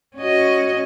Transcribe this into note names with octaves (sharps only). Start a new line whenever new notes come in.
C#4 F#4 D#5